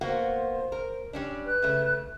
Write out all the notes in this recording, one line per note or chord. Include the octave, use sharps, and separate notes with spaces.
A#3 B3 F#4 C5
A#4
G3 C#4 D4
B4 F#6
C#3 A3